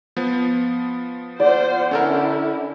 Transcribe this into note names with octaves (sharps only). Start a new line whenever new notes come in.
F3 B3
F4 C5 D5 F#5
D3 C#4 E4 A4 A#4